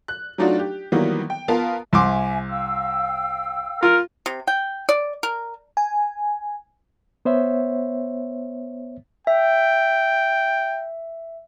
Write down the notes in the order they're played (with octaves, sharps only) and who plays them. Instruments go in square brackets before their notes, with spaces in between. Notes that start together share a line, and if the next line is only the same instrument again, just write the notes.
[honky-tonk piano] F#6
F#3 A3 D4 D#4 F4 F#4
G4
D#3 E3 F#3 G3 A#3 B3
G5
B3 F4 A#4 F5 A5
[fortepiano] C2 C6 D6 [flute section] E5 G#5
[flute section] F5 G5 E6
[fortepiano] F4 [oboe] A#4
[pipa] C3
G5
D5
A#4
[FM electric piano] G#5
[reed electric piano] B3 C5 C#5 E5
[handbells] E5 [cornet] G5